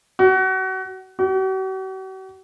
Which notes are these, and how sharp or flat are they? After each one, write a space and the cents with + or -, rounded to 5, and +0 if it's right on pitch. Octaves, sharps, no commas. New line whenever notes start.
F#4 +30
F#4 +45